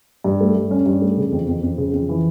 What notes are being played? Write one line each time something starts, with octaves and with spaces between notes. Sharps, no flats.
G2
A3
G2
C#4
G2
A3
C#3
F2
F2
F2
C#3
F2
E3